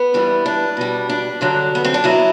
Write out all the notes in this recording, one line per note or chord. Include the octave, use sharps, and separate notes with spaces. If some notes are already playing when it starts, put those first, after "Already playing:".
Already playing: B3
G2 E3 G3
D4
B2 G3
D4
G2 D3 F#3
B3
C4
D4
B2 F#3 E4